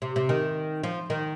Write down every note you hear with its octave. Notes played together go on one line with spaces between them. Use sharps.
C3
C3
D#3
F3
D#3